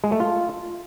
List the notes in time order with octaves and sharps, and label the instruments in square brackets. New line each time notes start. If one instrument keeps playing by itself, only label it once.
[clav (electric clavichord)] G#3
A3
F4